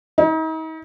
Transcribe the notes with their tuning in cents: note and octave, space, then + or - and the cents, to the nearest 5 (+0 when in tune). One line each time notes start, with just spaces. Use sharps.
D#4 +40